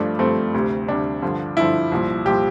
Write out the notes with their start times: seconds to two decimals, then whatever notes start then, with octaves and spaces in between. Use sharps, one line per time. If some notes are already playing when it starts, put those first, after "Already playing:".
Already playing: G2 F3 A3 D4
0.19 G2 F3 A3 C4
0.54 D2 C3 G3
0.88 D2 C3 G3 D4
1.22 G2 D3 F3
1.57 G2 D3 F3 E4
1.92 C2 A#2 F3
2.25 C2 A#2 F3 G4